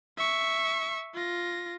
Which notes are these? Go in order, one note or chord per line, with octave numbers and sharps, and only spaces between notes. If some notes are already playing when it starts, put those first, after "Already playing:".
E5 C#6
F4 A#6